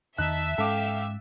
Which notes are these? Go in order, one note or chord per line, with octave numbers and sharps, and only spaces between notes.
E2 D#3 D#4 E5 A5 F#6
G#2 G#3 C#4 A4 F5 G5 D6